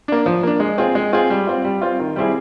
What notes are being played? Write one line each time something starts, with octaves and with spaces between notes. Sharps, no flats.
A#3 D4
F3
A#3 D4
G#3
C4 F4 G#4
G#3
C4 F4 G#4
G3
C4 F4
G3
C4 F4
D#3
G3 C4 E4 G#4